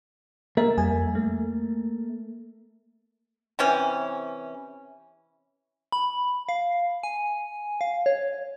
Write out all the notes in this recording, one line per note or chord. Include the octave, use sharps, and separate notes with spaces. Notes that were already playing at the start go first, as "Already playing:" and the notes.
A#3 A4 A#4 E5
F2 G3 G#5
A3
C3 E3 C#4
B5
F5
G#5
F5
C#5